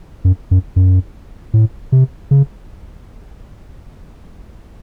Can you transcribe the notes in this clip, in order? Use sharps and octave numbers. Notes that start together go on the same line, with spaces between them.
F#2
F#2
F#2
A2
C3
C#3